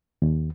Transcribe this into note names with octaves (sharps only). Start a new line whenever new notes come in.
D#2